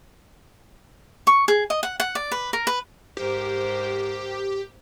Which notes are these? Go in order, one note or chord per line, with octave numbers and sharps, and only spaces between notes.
C#6
G#4
D#5
F#5
F#5
D5
B4
A#4
B4
G#2 G4 A#4 C5